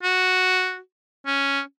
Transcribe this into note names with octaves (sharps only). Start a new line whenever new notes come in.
F#4
C#4